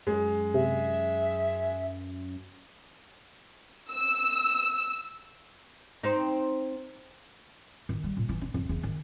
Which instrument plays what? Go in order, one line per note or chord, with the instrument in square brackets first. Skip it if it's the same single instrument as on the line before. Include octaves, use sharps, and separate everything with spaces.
[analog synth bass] F#2 [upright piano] G#3
[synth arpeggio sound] C3 [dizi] E5
[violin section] E6
[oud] C4 D#4
[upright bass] D#3
G3
A#2
E3
D4
F2
E2
D#3